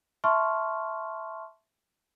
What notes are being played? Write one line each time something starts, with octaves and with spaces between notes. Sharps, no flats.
E5 A5 C6 C#6 F6